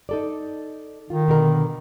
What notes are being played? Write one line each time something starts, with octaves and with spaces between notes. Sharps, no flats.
D#4 A4 D5
D#3 F4
B2 D3 A#4